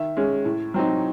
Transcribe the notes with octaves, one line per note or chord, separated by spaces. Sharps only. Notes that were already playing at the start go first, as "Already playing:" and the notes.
Already playing: D#3 E5
G#3 C#4
A2
F#3 C4 D#4